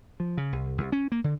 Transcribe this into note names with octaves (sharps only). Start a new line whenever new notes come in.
F3
C#3
C2
C2
C#4
A#3
D3